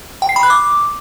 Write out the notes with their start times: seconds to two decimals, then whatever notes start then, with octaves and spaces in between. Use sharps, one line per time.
0.22 G5
0.29 C7
0.36 B5
0.43 F#6
0.50 D6